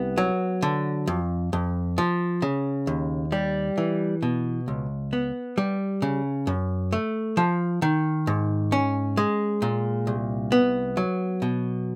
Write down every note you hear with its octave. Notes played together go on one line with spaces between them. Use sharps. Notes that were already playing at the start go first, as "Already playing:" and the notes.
Already playing: C2 B3
F#3
D3
F2
F2
F3
C#3
D#2
G3
E3
B2
C#2
B3
G3
C#3
F#2
A3
F3
D#3
G#2
C#4
G#3
A#2
C2
B3
F#3
B2